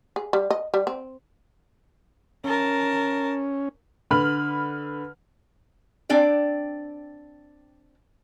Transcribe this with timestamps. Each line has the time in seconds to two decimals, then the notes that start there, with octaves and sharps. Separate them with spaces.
0.16 G#4
0.33 G3
0.50 D#5
0.74 G3
0.87 C4
2.44 C#4 A#4 A5
4.11 D3 B4 B5 F6 F#7
6.09 C4 D4 D5 G5